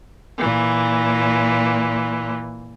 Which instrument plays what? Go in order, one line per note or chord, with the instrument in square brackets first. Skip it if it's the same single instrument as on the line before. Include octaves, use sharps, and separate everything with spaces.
[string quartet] A#2 E3